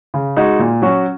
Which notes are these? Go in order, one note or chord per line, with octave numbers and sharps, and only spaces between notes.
C#3
G#3 D#4 F#4
A#2
F#3 C#4 F#4